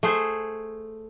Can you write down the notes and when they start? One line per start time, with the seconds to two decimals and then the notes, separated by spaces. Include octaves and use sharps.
0.03 A3 G#4 C5